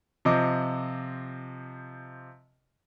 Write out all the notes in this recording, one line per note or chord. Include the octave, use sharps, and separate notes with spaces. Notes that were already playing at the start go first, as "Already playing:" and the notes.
C3 F3 D#5 D6